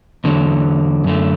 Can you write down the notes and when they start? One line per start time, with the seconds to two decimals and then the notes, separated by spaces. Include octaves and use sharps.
0.24 E2 D3 F#3
1.04 F#2 D3 A3